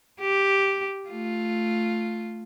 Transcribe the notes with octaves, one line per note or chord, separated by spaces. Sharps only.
G4
A3 F4